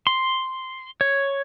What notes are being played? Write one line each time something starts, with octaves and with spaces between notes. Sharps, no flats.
C6
C#5